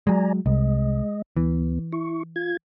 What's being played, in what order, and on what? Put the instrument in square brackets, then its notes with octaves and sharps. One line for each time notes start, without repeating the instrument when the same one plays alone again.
[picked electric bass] F#3 G#3 [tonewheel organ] D5 G#5 A#5
[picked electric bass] C2 [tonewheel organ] G#3 D#5
[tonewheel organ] D2 B3 [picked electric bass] E3
[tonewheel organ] E4 C#6
F4 G#6